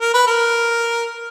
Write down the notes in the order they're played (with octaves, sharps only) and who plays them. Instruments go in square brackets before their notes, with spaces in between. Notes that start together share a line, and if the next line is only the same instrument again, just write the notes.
[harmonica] A#4
B4
A#4